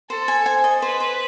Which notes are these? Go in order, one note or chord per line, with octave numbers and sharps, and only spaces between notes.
A4 C5
G#5
C5 G#5
D#5
B4 C5
C5